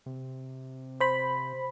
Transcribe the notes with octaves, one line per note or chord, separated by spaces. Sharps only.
C3
C5 B5